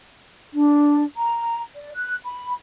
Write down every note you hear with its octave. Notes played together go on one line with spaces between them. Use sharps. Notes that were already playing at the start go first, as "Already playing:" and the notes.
D4
A#5
D5
F#6
B5